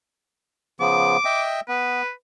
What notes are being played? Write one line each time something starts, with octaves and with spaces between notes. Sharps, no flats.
C#3 F3 B3 D6
D#5 E5 G5
B3 B4